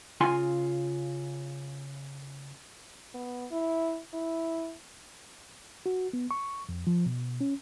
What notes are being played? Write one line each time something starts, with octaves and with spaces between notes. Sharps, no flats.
C#3 F4 G#5 C6
B3
E4
E4
F#4
B3
C#6
F2
F3
B2
C#4